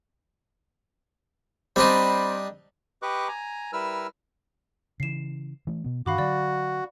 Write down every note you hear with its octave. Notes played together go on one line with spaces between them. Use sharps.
G3 C4 D4 D#4 C5 B5
G4 B4 D#5 C#6 D6 F#6
G#5 A#5
G3 E4 A#4 B4 E6 F6
C#3 E3 C7 E7
E3 A3
B2 B3
G2 D#3 D4 F#4 F5 B5 D6
D3 F#3 D5